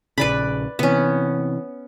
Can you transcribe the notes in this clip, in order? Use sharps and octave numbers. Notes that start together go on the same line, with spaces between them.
A#1 C#3 B4 D5 B5
C3 E3 B3 C#4